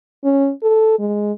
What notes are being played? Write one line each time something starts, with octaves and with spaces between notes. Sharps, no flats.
C#4
A4
G#3